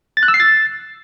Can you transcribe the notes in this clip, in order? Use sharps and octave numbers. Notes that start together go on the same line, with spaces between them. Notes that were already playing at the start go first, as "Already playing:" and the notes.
A6
F#6
E6
C7
A6